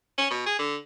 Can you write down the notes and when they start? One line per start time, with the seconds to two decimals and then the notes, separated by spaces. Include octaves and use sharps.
0.18 C#4
0.30 B2
0.46 G#4
0.59 D3